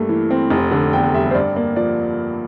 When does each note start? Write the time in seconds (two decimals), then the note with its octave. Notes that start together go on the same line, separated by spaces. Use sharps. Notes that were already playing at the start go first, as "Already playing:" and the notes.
Already playing: G2 A3 A#3
0.09 E3
0.30 C4
0.51 F1
0.72 D3
0.93 E2 G5
1.14 G3 E5
1.31 C5
1.34 G2 D5
1.56 A#3 D5
1.76 F3 D5